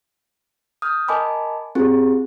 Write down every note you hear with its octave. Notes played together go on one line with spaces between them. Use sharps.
D#6 F6 G6
A#4 D#5 G#5 A5 B5 D6
C4 F4 G4 G#4